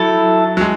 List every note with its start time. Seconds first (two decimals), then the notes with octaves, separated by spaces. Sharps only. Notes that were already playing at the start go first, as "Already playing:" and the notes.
Already playing: F#3 A3 E4 A4
0.57 F#3
0.61 G#3